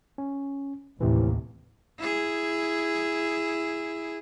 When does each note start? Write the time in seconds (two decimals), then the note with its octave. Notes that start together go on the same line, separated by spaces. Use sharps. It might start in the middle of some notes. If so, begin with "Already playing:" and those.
0.18 C#4
1.01 A1 D#2 A2 C3 E3
1.98 E4 G#4